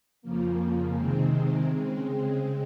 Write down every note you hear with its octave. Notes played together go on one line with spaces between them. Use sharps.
F2 C#3 F3 A#3
C3 D#3 G#3 C4
C#3 G#3 C4